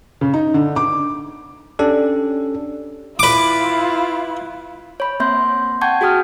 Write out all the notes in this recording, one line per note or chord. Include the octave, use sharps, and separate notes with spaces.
C#3
D#4
D3
D6
C#4 D4 G4 A4
E4 F4 B4 D6
C#5 B5
A#3 C4 E5 C6 G6
F#5 G5 A5 C#6 G6 G#6
F#4 G#4 G5 D#6 F6